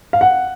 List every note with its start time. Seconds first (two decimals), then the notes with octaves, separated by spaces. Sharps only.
0.13 F5
0.21 F#5